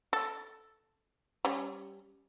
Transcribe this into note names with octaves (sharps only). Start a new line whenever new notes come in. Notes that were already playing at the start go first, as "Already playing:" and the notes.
A4
G3 C#4